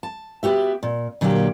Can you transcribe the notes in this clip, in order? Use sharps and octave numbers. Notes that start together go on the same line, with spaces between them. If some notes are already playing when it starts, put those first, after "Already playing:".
A5
B3 F#4 G4 E5
A#2
A#2 D3 F#3 A#3 G4